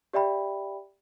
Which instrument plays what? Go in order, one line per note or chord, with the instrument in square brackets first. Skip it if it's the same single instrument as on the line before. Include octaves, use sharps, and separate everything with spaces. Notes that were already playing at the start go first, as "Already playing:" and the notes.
[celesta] G4 D5 E5 G5 B5